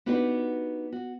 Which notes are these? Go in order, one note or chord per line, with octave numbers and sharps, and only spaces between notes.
B3 D4 D#4 F#4 G4 B4
F#4